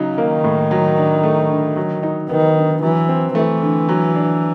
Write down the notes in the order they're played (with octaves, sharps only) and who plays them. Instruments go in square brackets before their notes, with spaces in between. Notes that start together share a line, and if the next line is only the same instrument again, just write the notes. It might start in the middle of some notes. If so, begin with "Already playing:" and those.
Already playing: [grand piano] C#3 F#3 D#4
[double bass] D#3 [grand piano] A#3
[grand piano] A2
F#3
D4
A3
D3
F#3
D#4
[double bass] D#3 [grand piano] B3
[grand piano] D3
[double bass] E3 [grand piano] F#3
[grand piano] C4
[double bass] E3 [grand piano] A3
[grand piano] D3
F#3
D4